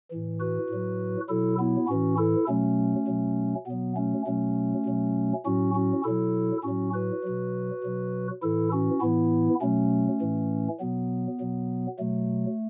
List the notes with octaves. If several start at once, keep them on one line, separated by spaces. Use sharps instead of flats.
A2 E3
F#4 B4
A2 F#3
B2 F#3 E4 A4
B3 E4
A2 E3 C#4 F#4
E4 A4
B2 F#3 A3 C#4
B2 F#3
B2 F#3 B3
A3 C#4
B2 F#3 A3 C#4
B2 F#3
A2 F#3 C#4 F#4
C#4 F#4
B2 F#3 E4 A4
A2 C#4 F#4
F#3
F#4 B4
B2 F#3
B2 F#3
A2 E3 E4 A4
C#4 F#4
A2 E3 B3 E4
B2 F#3 A3 C#4
A2 E3
B2 F#3 B3
B2 F#3
B2 F#3 A3